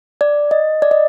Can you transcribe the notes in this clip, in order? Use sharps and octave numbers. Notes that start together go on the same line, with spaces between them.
D5
D#5
D5
D#5